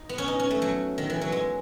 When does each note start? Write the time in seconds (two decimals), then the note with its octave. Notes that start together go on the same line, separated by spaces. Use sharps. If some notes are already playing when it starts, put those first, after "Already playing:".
Already playing: D#4
0.09 B3
0.18 C#4
0.28 D#4
0.40 C#4
0.51 A3
0.62 F#3
0.98 D#3
1.10 E3
1.21 F#3
1.32 G#3